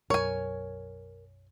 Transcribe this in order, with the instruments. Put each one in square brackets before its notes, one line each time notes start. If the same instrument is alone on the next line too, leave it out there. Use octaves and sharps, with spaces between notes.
[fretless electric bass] B1 F#2 [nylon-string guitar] A#4 [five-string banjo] C#5 G#5